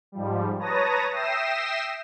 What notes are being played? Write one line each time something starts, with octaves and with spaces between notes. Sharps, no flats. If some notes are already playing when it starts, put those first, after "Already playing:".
G#2 F3 G3
B4 C#5 A5 A#5 D#6 A#6
E5 G5 D#6 A#6 C7 E7